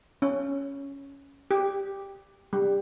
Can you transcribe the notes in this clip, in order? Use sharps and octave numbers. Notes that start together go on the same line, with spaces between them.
C#4
G4
G3